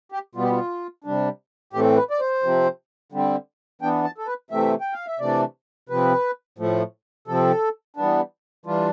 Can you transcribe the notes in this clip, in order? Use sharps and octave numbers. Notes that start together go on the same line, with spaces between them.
G4
B2 G3 B3 F4
G4
F4
C3 G3 D4
A2 E3 A3 C4 G4
B4
D5
C5
C3 F3 C4
D3 G3 C4
E3 B3 D4 G5
A5
A4
B4
C3 E3 A3 C4 E5
G5
F5
E5
C3 E3 A3 D4 D5
C3 F3 C4 B4
A2 F3 A3
C3 F3 C4 A4
E3 G3 B3 D4
E3 G3 D4 F4